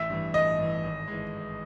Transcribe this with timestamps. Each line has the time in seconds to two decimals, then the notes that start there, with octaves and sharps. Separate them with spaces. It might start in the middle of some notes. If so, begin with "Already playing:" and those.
Already playing: A1 E5
0.10 G2 E3
0.34 A1 D#5
0.59 G2 E3
0.84 G#1
1.08 E3 G#3